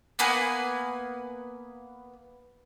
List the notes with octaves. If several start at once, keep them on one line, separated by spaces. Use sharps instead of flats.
A#3 B3 B4 G#5